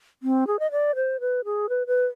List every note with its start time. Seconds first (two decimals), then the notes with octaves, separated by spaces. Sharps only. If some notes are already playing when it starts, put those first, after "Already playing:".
0.23 C4
0.47 G#4
0.60 D#5
0.72 D5
0.95 C5
1.20 B4
1.45 G#4
1.69 B4
1.87 B4